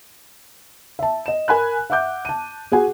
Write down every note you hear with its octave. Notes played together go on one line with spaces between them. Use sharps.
E5 A5
D#5 E7
A#4 G#5 B5 F#6
E5 F#5 D6 G6
A5 D#7
F#4 G#4 F#5 G#5